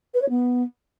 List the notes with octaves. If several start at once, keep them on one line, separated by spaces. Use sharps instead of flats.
B4
C#5
B3